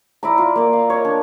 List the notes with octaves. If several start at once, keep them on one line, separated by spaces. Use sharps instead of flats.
E4 D5 A#5
F4
A#3 D5
F5
C#5 D#5
D4